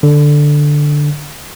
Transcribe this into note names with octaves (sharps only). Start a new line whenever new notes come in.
D3